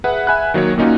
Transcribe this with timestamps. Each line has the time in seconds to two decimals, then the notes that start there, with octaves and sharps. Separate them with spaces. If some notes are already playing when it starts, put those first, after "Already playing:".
0.04 G#4 B4 E5 F#5
0.27 E5 G#5 B5 F#6
0.54 D#3 F#3 A#3 C#5
0.78 A#2 A#3 C#4 D#4 F4 F#4